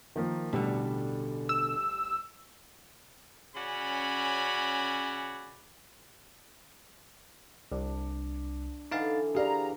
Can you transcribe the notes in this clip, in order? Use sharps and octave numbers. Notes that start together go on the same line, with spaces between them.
D#3 F3 A#3
A1 B2 D3 G3 A4
E6
C#3 C#4 F#4 D5 G#5 B5
C2 D4
D3 E3 D#4 F5 A6
G4 G#4 D5 F5 A#5